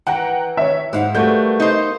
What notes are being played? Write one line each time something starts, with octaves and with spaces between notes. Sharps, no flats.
E3 F#5 G5 A#5
C#5 E5
G#2 E4 F5 F#5
G3 A3 A#3 F#4 B4 G6
D#4 C5